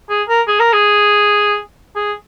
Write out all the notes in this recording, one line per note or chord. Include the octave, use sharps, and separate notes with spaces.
G#4
A#4
G#4
A#4
G#4
G#4